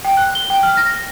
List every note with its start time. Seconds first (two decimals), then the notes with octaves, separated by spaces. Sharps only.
0.05 G5
0.17 F#6
0.35 G7
0.50 G5
0.63 F6
0.77 A#6